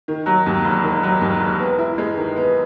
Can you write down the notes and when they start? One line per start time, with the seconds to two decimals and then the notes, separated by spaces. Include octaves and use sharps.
0.08 D#3
0.26 F#3
0.46 D#2
0.65 E1
0.83 D#3
1.03 F#3
1.21 D#2
1.40 E1
1.59 B3
1.78 E4
1.98 G#3
2.17 D#3
2.36 B3